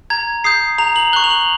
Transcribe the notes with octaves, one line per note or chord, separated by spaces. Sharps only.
A#5 G#6
D#6 G6 C7
A#5 F7
F#7
C#6 F#6 G7
F7
F#7